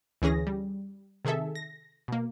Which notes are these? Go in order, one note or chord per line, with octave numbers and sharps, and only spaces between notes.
D2 E3 C#4 G#4 A#6
G3
C3 D#3 G#4 A4 E5
A#6
B2 A#3